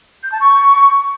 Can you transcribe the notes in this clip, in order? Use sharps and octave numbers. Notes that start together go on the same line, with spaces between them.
G6
A5
C#6